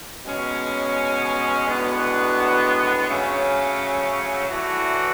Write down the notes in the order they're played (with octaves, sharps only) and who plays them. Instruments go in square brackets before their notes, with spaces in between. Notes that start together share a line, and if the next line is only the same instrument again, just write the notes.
[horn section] B2 G#3 C#4
A2 G#3 B3 D4 F#4
C#3 F#3 A3 C#4
A2 E3 A3 D4 F#4